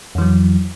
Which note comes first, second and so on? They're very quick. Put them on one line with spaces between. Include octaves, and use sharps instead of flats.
F2 E3 F#3